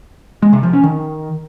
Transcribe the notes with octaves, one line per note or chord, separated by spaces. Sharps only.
G#3
C3
F3
C#4
D#3